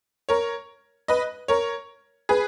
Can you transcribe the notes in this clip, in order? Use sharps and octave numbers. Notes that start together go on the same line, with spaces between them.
A#4 C#5
B4 D#5
A#4 C#5
G#4 B4